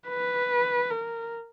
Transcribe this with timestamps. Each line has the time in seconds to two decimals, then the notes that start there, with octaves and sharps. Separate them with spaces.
0.08 B4
0.90 A#4